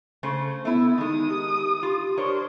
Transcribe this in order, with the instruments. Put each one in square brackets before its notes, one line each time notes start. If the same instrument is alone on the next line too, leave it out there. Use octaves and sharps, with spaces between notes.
[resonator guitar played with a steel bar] C#3 A3 C5
[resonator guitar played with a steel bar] A3 E4 [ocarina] B3
[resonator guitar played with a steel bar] D#3 G#3 [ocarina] D#4 [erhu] D#6
[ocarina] G4
[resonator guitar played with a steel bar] F4
[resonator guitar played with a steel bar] D4 A#4 C#5 [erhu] C5